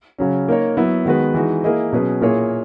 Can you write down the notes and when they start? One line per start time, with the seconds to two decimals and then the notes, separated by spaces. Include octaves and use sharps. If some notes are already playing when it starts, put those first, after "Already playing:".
0.18 C#3 F#3 C#4
0.48 A#3 D#4 A#4 C#5
0.77 F#3 B3 E4
1.05 D#3 G#3 B3 F#4 B4
1.34 E3 G#3 D#4 F#4
1.64 A#3 E4 G#4 D#5
1.92 B2 F#3 C#4 G#4 B4
2.21 A#2 A#3 E4 G#4 C#5